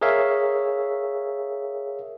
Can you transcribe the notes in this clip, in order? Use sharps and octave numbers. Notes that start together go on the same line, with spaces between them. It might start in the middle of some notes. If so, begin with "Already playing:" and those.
G#4 A#4 C#5 E5 F5